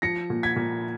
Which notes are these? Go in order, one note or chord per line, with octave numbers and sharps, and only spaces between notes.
F3 A#6 C#7
A#2
G#6 B6
A#2